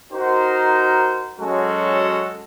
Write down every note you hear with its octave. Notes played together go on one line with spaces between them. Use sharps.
D#4 F#4 A#4 C5
F#3 G#3 C#4 F#4 A4